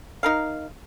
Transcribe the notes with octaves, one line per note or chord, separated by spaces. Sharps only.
D#4 A#4 F5